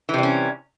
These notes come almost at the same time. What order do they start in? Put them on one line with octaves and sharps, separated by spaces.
E3 C3 G3 C#4